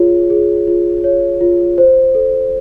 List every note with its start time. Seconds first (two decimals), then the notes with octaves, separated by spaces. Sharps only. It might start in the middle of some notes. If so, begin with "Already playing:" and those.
Already playing: F4 G#4 C#5
0.30 G#4
0.67 F4
1.04 C#5
1.41 F4
1.78 C5
2.15 A4